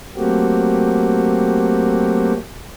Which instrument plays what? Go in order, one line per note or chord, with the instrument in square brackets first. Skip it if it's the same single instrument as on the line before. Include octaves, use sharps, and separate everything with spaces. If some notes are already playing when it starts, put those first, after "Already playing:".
[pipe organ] F#3 A3 A#3 C4 F#4 G4